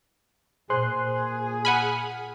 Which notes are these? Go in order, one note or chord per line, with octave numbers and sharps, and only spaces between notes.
A#2 G#4 C5 C6 F#6
F#5 G#5 B5 F6